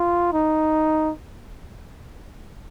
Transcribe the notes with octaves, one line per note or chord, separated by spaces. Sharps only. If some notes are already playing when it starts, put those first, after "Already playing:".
Already playing: F4
D#4